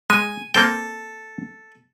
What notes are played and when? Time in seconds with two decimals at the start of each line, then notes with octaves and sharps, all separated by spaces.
0.10 G#3 G#5
0.54 A#3 C4 A4 G5